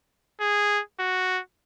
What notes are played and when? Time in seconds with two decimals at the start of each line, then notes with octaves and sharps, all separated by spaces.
0.40 G#4
0.99 F#4